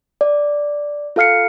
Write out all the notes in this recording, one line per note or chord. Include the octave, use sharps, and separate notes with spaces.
D5
F4 A4 F5 F6 C7 C#7